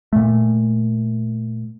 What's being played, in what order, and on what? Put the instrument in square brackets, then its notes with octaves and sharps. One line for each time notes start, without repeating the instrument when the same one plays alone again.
[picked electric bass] A#2 A3